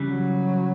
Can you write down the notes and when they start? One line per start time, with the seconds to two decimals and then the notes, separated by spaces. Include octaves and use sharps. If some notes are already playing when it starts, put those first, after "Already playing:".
Already playing: C#3 E3 G3
0.10 F#3